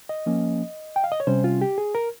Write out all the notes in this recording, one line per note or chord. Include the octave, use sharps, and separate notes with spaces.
D#5
F3 A#3 C#4
G5
F5
D#5
C#5
C3 G3 C#4 C5
F4
G4
G#4
A#4